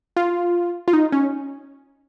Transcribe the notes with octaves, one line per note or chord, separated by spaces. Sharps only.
F4
F4
D#4
C#4